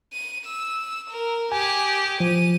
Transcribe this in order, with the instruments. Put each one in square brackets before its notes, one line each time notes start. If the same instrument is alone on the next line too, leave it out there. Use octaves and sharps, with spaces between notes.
[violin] D#7
E6
A#4
[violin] G4 G#4 [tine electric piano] G#5
[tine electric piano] F3 [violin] D#7